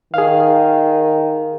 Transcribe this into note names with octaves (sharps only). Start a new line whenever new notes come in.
D#3 G#4 F5